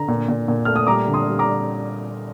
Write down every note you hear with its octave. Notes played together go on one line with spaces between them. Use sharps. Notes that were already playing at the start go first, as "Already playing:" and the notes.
Already playing: D3 A#5
A#2
A#2
A#2
A3 F6
D#6
G3 A#5 D6
D3
C6 D#6
G3
A#5 D6
G3